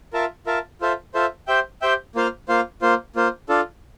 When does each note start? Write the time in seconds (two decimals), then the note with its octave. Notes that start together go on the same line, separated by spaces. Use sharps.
0.13 F4 A#4 E5 A5
0.46 F4 A#4 E5 A5
0.81 F4 A4 C5 E5
1.14 F4 A4 C5 E5
1.47 G4 C5 E5 G5
1.82 G4 C5 E5 G5
2.15 A#3 F4 C5 F5
2.48 A#3 F4 C5 F5
2.82 A#3 F4 C5
3.16 A#3 F4 C5
3.49 D4 F4 A4